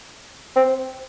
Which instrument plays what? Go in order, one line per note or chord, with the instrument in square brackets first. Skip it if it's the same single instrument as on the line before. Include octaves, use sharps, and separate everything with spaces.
[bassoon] C4